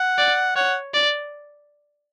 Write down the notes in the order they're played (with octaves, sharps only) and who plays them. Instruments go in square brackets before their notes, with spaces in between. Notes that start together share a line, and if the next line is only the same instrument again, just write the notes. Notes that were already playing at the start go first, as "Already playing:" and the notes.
Already playing: [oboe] F#5
[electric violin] D5
[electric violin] C#5 [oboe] F#5
[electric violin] D5